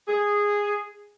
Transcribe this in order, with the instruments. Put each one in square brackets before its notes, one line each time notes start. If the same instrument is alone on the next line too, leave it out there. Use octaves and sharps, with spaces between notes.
[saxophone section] G#4